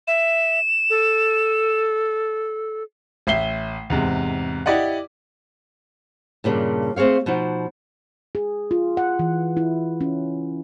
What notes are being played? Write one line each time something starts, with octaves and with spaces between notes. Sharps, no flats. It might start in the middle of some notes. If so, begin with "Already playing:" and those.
E5 E7
A4
A1 E5 C7 G7
E2 G#2 C3
E4 G4 D5 D#5 F#5
G2 A#2 C#3 D4
A3 C4 G#4 C#5 F5
B2 F3 D#4 F#4
G#4
F4
F#5
E3
E4
C#4